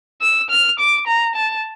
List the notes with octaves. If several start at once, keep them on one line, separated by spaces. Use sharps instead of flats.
E6
F6
D6
A#5
A5